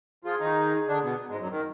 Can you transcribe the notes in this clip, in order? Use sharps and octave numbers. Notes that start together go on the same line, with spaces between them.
F3 F4 G#4
D#3 D#4
D3 D4
B2 B3
G#2 G#3
F#2 F#3
D#3 A#4